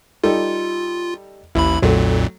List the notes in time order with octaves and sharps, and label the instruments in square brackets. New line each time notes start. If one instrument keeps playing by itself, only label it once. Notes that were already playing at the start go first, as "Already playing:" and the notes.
[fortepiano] G3 D#4 A4 [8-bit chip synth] F4
[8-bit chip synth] A1 D#2 B5 [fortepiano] E4
[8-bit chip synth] B1 F2 A#2 [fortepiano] F#3 A3